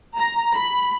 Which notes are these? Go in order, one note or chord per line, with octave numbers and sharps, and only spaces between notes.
A#5
B5